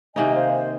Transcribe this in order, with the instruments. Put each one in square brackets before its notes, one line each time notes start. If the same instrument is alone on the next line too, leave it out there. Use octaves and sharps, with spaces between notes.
[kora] C3 D#3 A#3 D#4 [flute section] D#5 G#5
[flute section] C5 F5
C5